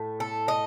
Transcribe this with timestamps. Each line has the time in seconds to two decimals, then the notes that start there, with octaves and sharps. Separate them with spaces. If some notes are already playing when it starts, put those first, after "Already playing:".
Already playing: A2 A3
0.20 A4
0.48 D#5